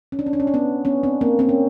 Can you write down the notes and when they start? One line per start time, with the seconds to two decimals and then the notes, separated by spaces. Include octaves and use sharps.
0.12 C#4
0.19 D4
0.26 C#4
0.33 D4
0.40 C#4
0.47 D4
0.54 B3 C#4
0.85 B3 C#4
1.03 C4 D4
1.21 A#3 C4
1.39 A#3 C4
1.49 C#4